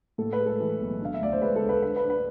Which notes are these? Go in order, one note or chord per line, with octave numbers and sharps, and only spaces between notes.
A2 A4
B4
G#3
A4
E3
B1
D3 F5
E5
D2 D5
C5
G#3 B4
A4
D2
B4
D3 B4
B4
D4
B4